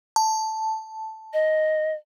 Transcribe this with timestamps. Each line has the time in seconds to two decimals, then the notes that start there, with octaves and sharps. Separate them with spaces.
0.16 A5
1.33 D#5